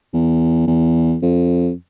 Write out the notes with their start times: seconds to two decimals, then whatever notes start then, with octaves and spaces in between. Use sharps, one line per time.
0.13 E2
0.67 E2
1.22 F2